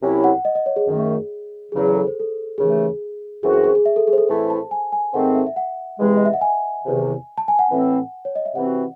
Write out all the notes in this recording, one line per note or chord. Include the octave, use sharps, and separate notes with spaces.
C2 C3 F#3 C#4 E4
F#5
D#5
D#5
C#5
G#4
F#2 D#3 A3
E2 C#3 F#3 G#4
A4
C5
A4
D#2 C#3 E3 A3 G#4
F#2 E3 C4 F#4 G#4
G#4
G#4
G#4
E5
A4
G#4
C5
A4
A2 E3 A3 C4 E4 C5
A5
G#5
G#5
G#2 D#3 A3 C4 F#5
E5
E5
F#5
E2 C3 E3 G#3
D#5
E5
F#5
G#5
E2 C3 D#3
A5
G#5
F#5
A2 E3 C4
C#5
D#5
E5
C3 E3 C4 F#4 F#5